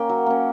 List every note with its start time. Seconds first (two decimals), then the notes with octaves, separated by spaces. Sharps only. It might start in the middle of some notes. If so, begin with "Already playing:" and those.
Already playing: A#3 C#4 G5
0.09 F#3
0.26 A#3 C#4